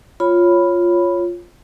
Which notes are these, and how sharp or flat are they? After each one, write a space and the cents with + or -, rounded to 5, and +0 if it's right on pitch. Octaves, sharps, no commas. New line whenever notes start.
F4 +0 C#5 +0 B5 +0